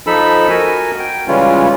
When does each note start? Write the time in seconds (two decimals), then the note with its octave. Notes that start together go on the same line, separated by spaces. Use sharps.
0.07 F3 D#4 A4 B5 E6
0.49 F#4 A#4 G#5
0.99 G5
1.28 C#3 E3 G3 G#3 C#4 F4